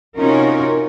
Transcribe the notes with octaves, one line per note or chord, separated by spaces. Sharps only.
C3 C#4 D#4 F4 F#4 A#4